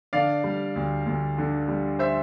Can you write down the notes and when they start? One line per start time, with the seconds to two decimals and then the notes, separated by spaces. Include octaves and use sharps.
0.13 D3 D5 F5
0.44 G3
0.76 D2
1.06 D2
1.38 D3
1.68 G3
1.99 C5 E5